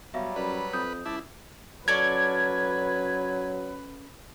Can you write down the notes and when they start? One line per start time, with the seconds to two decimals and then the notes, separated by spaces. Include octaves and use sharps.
0.14 B2 F#3 G3 E5 F5
0.36 F#2 B4 D5
0.73 F2 D#6 G6
1.06 C#2 E4 A5 D6
1.88 F#3 C#4 A4 B4 D5 G#6